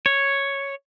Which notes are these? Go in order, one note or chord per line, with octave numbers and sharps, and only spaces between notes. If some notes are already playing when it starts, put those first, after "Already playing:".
C#5